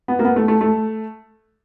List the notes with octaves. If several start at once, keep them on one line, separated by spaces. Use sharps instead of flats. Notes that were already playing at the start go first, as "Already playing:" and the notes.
B3
A#3
B3
A3
A3
A3